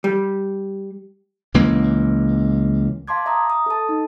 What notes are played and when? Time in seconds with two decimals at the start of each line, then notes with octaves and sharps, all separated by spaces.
0.04 G3
1.54 C#2 E3 A#3
3.08 F5 A5 C6 D6 G#6
3.26 E5 A#5 D#6
3.50 D#6
3.66 A4 A5
3.89 D#4